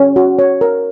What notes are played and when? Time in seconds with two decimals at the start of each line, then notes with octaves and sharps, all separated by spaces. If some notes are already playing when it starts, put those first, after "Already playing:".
Already playing: C#4
0.16 F#4
0.39 C#5
0.61 A#4